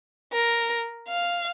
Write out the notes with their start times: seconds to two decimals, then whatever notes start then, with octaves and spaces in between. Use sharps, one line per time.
0.33 A#4
1.08 F5